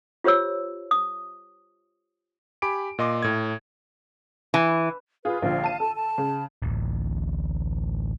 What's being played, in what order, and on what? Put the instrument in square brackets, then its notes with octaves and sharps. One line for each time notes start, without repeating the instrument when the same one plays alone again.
[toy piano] F4 G4 C5 C#5 E6
D#6
[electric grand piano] G4 G#5 B5 D6 D7
A#2 D#5 C6 D6
A2 G#6
[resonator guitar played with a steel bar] E3
[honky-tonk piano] F4 G#4 [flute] B4
[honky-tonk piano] A#1 D3 F3 [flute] F5
[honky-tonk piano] A5 D#7
[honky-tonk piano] A4 [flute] A5
[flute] A5
[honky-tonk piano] C#3
[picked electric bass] D1 A1